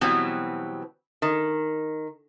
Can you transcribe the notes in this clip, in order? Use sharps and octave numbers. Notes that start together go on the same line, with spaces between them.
B2 E3 F#3 G3 B3 C4
D#3